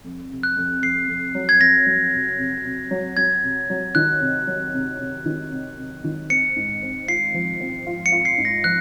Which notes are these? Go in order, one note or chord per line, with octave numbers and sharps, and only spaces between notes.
F2
C3
F#6
F2
F2 C7
F2
F#3
G#6
F2 A#6
F#3
C3
C3
C3
F#3
F#3 G#6
C3
F#3
D#3 F#6
C3
F#3
C3
C3
D#3
C3
C3
D#3
C4 C#7
G#2
C4
F4 C7
F3
C4
F4
C#7
F4
C7
G#2
A#6
F3 F#6